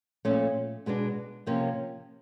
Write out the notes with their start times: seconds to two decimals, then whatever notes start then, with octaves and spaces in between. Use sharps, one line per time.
0.25 A#2 F3 A3 C#4
0.86 B2 G#3 B3 D4
1.47 C3 F3 A#3 C#4